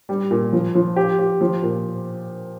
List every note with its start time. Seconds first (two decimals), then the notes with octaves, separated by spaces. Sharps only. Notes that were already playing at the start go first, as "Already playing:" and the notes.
0.09 G3
0.31 A#2
0.53 F3
0.75 F3
0.96 G4
1.19 G4
1.41 F3
1.63 A#2